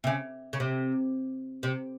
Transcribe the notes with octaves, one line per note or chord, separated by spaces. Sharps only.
C3
C#3
C#3
C3
C3